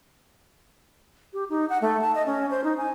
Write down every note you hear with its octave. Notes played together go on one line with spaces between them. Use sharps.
G4
D#4
F#5
A3
A5
D#5
C#4
C5
D#4
G#5